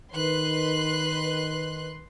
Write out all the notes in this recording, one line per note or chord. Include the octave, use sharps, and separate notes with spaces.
D#3 B4 C6 F#6